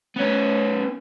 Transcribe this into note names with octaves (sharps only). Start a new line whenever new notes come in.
B3 C#4